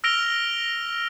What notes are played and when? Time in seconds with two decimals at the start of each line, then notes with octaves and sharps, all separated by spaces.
0.04 E6 F6 A#6 D7 F7 G7